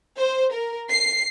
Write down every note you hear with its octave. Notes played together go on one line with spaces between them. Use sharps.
C5
A#4
C7